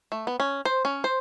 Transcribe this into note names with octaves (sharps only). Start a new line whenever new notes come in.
A3
B3
C#4
C5
C#4
C5